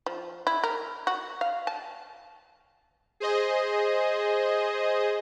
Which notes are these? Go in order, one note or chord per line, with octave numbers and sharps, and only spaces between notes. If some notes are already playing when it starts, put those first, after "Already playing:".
F3
E4
A#4
F#4
F5
A5
G#4 C5 D#5